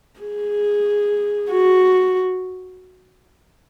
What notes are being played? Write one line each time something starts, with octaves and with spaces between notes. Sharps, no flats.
G#4
F#4